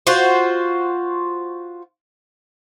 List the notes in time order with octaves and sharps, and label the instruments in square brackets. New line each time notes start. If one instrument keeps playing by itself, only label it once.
[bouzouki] F4 F#4 C5